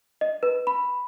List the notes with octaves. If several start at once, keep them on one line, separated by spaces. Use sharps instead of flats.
D#5
B4
B5